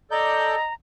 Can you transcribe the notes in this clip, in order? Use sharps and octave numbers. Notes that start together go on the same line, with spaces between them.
A4 D5 D#5 A#5 G6